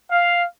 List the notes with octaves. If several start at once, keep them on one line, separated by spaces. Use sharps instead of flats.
F5